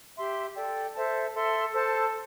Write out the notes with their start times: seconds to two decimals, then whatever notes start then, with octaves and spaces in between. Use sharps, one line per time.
0.16 G4 E5 C6
0.55 A4 D5 G5
0.94 A4 C5 E5 A5
1.34 A4 E5 C6
1.73 A4 C5 A5